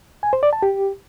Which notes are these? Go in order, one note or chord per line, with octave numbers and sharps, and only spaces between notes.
G#5
C5
D5
A5
G4